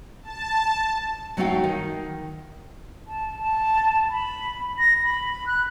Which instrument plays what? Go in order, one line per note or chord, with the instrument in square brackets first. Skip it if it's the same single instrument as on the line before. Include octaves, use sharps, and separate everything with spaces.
[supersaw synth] A5
[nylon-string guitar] F#3 A3 D#4 F#4 F5 G5
D#3
[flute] A5
A5
B5
A#6
B5
F#6